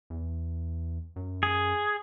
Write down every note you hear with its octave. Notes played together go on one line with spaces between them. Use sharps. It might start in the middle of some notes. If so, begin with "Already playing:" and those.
E2
F#2
G#4